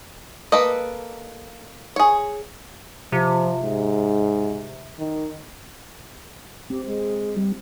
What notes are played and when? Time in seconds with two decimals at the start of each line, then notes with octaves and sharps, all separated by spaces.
0.52 A#3 A4 B4 D#5
1.96 G#4 C#5
3.12 C3 F3
3.62 G#2
4.98 D#3
6.70 C4 G4
6.86 G#3
7.36 G3